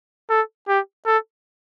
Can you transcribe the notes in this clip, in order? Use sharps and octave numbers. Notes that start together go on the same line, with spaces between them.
A4
G4
A4